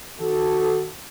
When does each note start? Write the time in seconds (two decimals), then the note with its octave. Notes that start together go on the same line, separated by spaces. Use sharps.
0.20 D#3 F#4 A4